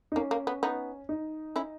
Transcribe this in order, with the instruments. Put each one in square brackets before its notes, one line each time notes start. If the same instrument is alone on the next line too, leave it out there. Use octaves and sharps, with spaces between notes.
[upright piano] D#4
[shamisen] A#3 [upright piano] C#4
[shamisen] A#3
B3
B3 D#4
[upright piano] D#4
[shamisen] C#4 E4